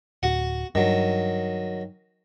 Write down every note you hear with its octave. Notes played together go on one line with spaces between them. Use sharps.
D1 F#4 F#5
G2 D#3 F#3